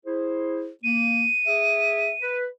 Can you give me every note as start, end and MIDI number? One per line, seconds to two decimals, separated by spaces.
0.06 0.69 64
0.06 0.69 68
0.06 0.69 72
0.84 1.26 58
0.84 2.36 99
1.46 2.12 68
1.46 2.12 76
2.21 2.47 71